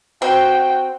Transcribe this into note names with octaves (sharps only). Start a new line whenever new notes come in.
C4 F#4 G5